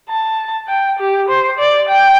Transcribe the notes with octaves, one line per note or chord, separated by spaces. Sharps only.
A5
G5
G4
C5
D5
G5